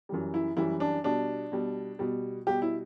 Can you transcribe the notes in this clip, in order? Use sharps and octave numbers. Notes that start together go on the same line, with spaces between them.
F#2 E3 G3
E4
F#2 E3 G3 E4
D4
B2 G3 D4
B2 G3
B2 G3
B2 G3 G4
E4